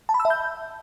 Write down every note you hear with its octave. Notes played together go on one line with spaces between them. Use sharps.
A5
B5
E6
E5
G6